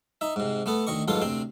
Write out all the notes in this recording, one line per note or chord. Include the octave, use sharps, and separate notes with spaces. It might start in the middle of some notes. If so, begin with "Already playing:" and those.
D#4 E5
G#2 C3
A3 B3 A4
D2 D#3 D#5 C#6
B1 G#2 F4 A4 C6
D2 C3 C4 G5